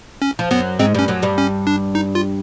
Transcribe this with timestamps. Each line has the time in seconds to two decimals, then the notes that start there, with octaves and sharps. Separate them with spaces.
0.22 C#4
0.39 F3
0.51 F#2 F#3 B3
0.79 G#2 G#3 C4
0.94 G2 G3 C#4
1.08 F#2 F#3
1.22 G2 G3
1.38 C#4
1.67 D4
1.95 D#4
2.15 F4